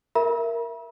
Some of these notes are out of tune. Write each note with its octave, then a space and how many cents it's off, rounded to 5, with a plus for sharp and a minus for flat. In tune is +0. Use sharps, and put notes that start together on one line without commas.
A#4 +0 E5 +15 B5 -45